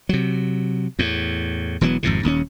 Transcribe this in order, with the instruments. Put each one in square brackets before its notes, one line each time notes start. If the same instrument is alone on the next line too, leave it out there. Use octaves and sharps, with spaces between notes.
[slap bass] C3 F#3
E2 A2
E1 E3 F#3 B3
G#1 F2 G#2 C3
D#1 D#2 C#3 C#4